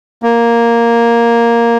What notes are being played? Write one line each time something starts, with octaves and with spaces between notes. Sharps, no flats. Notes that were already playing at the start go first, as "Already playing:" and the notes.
A#3